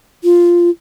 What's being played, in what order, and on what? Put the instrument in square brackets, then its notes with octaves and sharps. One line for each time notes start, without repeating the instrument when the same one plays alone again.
[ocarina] F4